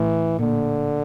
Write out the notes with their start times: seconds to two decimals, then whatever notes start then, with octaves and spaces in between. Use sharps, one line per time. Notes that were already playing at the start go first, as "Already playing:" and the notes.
Already playing: A2 E3 A3
0.39 A#2 D3 A#3